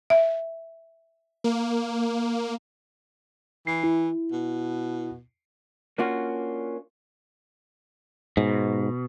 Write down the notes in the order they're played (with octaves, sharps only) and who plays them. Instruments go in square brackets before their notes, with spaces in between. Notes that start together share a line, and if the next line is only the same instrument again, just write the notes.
[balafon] E5
[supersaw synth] A#3
[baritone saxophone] E3 [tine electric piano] C7
[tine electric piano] E4
[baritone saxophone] B2
[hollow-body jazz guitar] A#3 C#4 D4 F4 F#4
[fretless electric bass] G#2 [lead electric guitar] B2